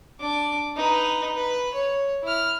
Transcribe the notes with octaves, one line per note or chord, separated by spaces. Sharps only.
D4 D6
D#4 B4
B4
C#5
E4 F6